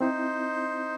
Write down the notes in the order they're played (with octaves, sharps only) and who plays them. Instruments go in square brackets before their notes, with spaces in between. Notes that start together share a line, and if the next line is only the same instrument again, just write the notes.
[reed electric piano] C4 E4 [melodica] D#4 C5